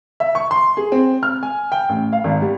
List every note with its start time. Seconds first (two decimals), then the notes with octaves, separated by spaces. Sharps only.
0.20 E5
0.35 C#6
0.51 C6
0.77 G#4
0.92 C4
1.23 F6
1.43 G#5
1.72 G5
1.89 A1
2.13 F5
2.24 G#1
2.42 G3